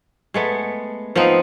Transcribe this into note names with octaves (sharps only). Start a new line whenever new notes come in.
G#3 A3 B3
F3 B3 C4 D#4